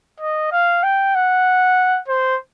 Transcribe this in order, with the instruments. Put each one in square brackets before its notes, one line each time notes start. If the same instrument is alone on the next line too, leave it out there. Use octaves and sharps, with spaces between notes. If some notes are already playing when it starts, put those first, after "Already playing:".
[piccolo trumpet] D#5
F5
G5
F#5
C5